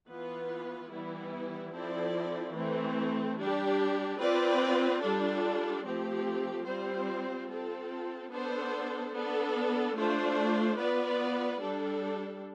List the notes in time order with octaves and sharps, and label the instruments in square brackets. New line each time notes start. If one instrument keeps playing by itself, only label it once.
[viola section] E3 B3 F4 B4
E3 G3 B3 E4
F3 C4 E4 A4 D5
E3 A3 C4
G3 D4 G4
C4 F4 B4 D5
G3 D4 F4 A4
F3 A3 C4 G4
G3 C4 F4 C5
C4 F4 A4
B3 D4 A4 C5
B3 D4 A4
A3 D4 F4 C5
B3 F4 B4 D5
G3 D4 A4